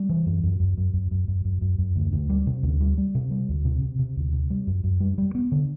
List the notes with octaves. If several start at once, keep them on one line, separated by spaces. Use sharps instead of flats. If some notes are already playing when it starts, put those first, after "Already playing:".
Already playing: G3
E3
F#2
F#2
F#2
F#2
F#2
F#2
F#2
F#2
F#2
F#2
D2
D2
G3
C3
D2
G3
G3
C3
G3
D2
C3
C3
C3
D2
C3
G3
F#2
F#2
G3
G3
B3
D3